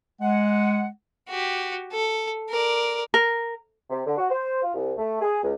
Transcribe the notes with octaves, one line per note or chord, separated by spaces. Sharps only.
G#3 F#5
F#4 G4
A4
A#4 D5
A#4
C3
D3
F#4
C5
F4
C2
A3
G#4
C#2